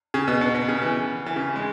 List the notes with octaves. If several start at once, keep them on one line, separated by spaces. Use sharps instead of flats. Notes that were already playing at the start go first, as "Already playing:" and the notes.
C#3
B2
B2
B2
C#3
E3
E3
C#3
G#3